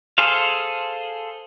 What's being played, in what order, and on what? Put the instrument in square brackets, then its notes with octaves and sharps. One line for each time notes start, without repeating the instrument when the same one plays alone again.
[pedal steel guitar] G#4 A4 C5 F5